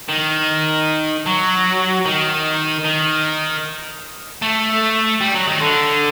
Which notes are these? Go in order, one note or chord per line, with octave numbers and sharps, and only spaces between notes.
D#3
F#3
D#3
D#3
A3
G3
F#3
D#3
D3